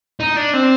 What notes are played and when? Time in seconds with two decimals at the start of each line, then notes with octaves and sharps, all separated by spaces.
0.20 D#4
0.37 D4
0.54 C4